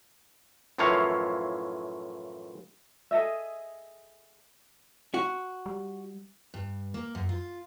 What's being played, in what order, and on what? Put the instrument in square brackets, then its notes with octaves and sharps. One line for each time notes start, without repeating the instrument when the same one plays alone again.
[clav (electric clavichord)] F#2 A2 E3 F3 C#5 F5
[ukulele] G#4 A4 D#5 E5
[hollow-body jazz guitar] F#4
[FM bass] G3
[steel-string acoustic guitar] G2
A#3
F#2
F4